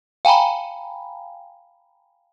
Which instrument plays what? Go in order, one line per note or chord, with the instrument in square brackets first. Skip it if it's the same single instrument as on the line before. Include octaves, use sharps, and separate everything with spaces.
[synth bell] F5 G5 G#5 A#5 B5